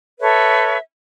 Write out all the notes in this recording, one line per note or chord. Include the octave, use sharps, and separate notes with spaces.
A4 B4 C#5 E5